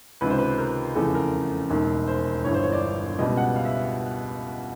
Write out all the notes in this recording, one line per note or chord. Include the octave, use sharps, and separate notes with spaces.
C#2 C3 D#3 B4
C5
B4
A#4
F1 E2 C#3 A4
A#4
E1 D#2 D#3
C5
G1 G2 E3 C#5
C5
C#5
D5
C#2 B2 G3 D#5
F#5
F5
E5